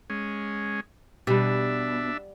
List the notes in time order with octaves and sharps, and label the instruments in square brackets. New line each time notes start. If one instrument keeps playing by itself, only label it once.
[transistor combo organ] G#3 C#4
[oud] B2 [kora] G3 G4 [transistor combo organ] D4 E5